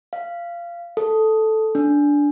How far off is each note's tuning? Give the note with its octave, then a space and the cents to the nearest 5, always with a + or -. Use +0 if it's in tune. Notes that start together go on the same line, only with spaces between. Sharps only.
F5 -20
A4 -5
D4 -10